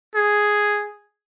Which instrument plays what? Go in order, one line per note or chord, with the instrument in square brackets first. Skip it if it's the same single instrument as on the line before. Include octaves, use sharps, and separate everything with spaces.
[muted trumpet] G#4